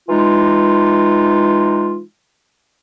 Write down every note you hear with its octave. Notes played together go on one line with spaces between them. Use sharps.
E3 G#3 D#4 F4